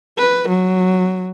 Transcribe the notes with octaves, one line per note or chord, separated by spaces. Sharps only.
B4
F#3